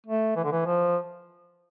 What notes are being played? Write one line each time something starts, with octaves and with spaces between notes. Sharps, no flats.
A3
E3
D3
E3
F3